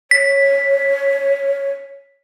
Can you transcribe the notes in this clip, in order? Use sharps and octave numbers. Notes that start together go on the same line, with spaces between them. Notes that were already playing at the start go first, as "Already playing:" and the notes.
C#5 B6